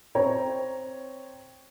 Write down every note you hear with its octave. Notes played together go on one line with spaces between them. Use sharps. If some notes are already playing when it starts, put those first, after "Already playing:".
C4 C#5 G5 A#5